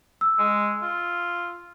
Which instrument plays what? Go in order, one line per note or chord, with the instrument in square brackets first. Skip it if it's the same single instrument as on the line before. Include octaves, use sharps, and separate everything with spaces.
[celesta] E6
[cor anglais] G#3
F4